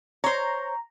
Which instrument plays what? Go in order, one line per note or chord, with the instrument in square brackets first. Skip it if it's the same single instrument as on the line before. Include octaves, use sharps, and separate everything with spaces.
[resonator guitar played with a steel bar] C5 C#5 [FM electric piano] A#5